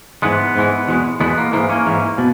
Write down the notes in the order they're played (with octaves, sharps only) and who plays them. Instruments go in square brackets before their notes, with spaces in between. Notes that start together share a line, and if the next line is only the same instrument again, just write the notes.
[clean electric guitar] G#2 E3 G#3 B3
G#2 E3 G#3
E2 B2 G#3
E2 B2 G#3 B3
A#3
G#2 E3 G#3 A#3
A#3 C#4
G#2 E3 G#3
B2